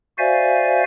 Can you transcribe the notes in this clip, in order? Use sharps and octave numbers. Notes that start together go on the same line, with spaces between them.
F#4 C5 D5 E5 F5 G#5